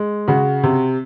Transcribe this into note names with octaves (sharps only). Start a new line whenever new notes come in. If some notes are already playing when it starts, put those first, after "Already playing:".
Already playing: G#3
C#3 F#4
C3